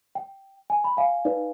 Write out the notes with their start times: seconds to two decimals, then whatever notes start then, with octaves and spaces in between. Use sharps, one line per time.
0.15 G5
0.70 G#5
0.84 B5
0.97 F5 G#5
1.25 D#4 B4 D5